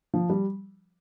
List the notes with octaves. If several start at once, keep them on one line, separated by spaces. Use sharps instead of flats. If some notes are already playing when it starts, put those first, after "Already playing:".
F3
G3